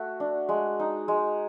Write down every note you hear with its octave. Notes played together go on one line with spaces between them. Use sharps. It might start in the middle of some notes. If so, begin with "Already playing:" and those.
Already playing: A3 F#4
D4
G#3
D#4
G#3